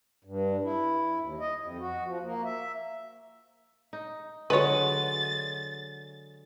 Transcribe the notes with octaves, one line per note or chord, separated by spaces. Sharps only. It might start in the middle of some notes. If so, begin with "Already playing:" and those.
G2
E4
D#2
D#5
F2
F#4
F3
A#3
E5
D#4
D3 F#3 G#3 B4 C#5 A6